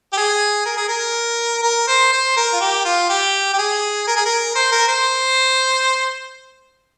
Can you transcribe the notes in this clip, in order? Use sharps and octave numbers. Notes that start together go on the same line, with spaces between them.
G4
G#4
A#4
G#4
A#4
A#4
C5
C5
A#4
F4
G4
F4
G4
G4
G#4
A#4
G#4
A#4
C5
A#4
C5